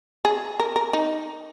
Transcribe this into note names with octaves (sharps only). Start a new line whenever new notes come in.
G#4
A#4
A#4
D#4